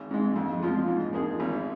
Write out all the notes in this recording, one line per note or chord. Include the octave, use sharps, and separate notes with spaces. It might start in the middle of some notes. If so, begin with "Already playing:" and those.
Already playing: G#1
G#2 G#3
F2
F3 G#3 F4
G#2
F3 A#3 D#4 G#4
G#1